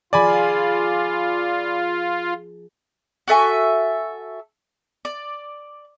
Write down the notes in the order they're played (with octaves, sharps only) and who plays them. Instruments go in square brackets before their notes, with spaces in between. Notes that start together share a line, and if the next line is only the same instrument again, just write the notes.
[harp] F3 G#4 [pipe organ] F4 [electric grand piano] D5 G#5 B5
[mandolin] F#4 A4 E5 G#5
D5